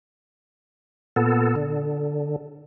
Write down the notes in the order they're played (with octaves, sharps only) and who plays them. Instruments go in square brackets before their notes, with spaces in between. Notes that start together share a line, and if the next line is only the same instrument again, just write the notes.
[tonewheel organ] A#2 B3 A4
D3